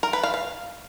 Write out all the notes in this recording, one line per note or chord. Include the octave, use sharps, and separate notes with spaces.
A#4
B4
F5
F5